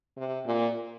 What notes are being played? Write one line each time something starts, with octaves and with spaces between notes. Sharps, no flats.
C3
A#2